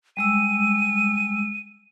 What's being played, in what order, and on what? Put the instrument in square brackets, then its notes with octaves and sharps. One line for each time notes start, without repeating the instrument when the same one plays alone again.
[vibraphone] G3 G#3 E6 [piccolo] D#7